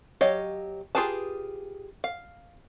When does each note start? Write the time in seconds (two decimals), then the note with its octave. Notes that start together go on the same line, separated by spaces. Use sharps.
0.21 F#3 G4 C#5 D#5 F5
0.95 F4 G4 G#4 B4 A5
2.04 F5